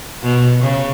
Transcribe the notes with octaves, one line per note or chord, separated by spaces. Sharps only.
B2
C#3